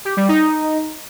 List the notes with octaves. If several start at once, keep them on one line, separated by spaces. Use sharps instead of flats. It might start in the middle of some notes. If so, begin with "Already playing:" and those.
G4
G3
D#4